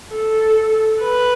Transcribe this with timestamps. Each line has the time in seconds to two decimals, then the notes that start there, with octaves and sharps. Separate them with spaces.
0.12 A4
1.03 B4